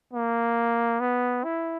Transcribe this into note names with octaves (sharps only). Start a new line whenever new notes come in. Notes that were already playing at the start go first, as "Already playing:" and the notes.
A#3
B3
E4